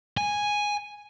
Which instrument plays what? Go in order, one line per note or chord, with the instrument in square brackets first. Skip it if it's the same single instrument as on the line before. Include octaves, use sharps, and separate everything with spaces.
[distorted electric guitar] G#5